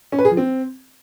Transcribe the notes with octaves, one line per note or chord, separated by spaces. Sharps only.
C#4
B4
G#4
F3
C4